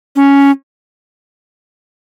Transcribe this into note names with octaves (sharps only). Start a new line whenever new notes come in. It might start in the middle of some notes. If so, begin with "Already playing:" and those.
C#4